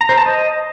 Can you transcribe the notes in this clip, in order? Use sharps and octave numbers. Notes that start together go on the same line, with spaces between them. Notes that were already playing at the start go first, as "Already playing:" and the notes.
A#5
C5
A5
D#5